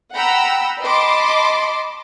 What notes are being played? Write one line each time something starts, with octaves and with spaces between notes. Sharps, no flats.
F#5 G5 A#5 B5 E6
D#5 A5 B5 C6 D6